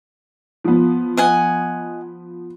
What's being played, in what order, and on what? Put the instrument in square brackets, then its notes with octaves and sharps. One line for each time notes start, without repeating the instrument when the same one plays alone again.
[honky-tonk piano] F3 B3
[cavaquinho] D#5 F#5 G#5